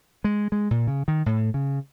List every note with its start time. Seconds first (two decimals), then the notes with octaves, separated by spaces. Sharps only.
0.24 G#3
0.52 G#3
0.71 A#2
0.87 C#3
1.08 D#3
1.26 A2
1.54 C#3